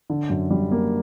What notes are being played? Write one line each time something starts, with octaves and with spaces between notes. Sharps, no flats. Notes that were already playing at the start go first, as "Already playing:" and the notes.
D3
F#2
G3
A#3